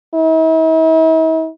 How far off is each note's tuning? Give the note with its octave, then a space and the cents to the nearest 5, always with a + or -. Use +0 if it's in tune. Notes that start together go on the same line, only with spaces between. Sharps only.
E4 -45